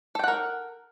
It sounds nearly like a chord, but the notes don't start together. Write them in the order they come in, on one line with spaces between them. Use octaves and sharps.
A4 G5 F#5 A#4